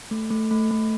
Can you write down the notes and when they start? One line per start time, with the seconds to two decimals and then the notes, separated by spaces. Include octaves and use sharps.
0.11 A3
0.31 A3
0.51 A3
0.71 A3